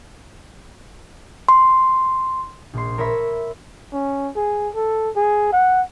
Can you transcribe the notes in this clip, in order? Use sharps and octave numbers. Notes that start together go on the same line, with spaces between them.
C6
A#1 C6
A#4 C#5 E5 A#5 B5 E6
C#4
G#4
A4
G#4
F#5